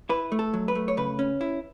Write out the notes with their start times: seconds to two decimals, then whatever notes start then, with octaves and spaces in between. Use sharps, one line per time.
0.09 E4 B4
0.32 A3
0.39 A4
0.54 F#3
0.68 B4
0.75 A3
0.88 C#5
0.97 C#3 B4
1.19 C#4
1.41 E4